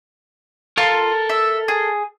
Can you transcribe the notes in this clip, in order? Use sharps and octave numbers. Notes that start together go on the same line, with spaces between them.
F4 A4 A#4
E5
G#4